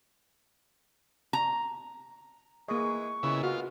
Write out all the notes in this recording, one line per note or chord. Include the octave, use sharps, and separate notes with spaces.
A#5
E3 G#3 A#3 G#4 D#5 C#6
A#2 C#3 G#3 B3 E4
F4 F#4